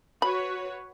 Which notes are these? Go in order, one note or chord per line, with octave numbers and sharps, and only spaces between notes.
F#4 B4 C#5 B5